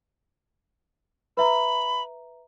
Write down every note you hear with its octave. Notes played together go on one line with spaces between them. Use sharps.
B4 E5 A#5 B5